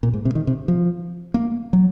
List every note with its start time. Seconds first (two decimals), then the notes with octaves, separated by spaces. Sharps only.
0.03 A#2
0.13 G#2
0.25 C3
0.35 D#3
0.47 C3
0.68 F3
1.34 A#3
1.73 F#3